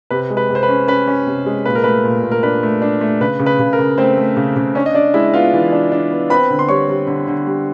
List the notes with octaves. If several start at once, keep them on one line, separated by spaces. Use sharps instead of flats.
C3 B4
G#3
B4
C3
C5
B4
C#4
C#4 B4
C#4
C3
G#3
A#2 B4
A#4
A3 B4
A#2
A#2
A#4
D4 B4
A3
D4
A3
C#3 B4
C#3
B4
C#3
A#4
C#3
A3 C4 C5
A3
C#3
C#3
C#4 D4 C#5
D#5
D4 D5
G#3 E4 E5
B3 F4 F5
E3
D4
D4
B3
C4 B4 B5
D3
C6
G3 C#5 C#6
G3
D3
D3
G3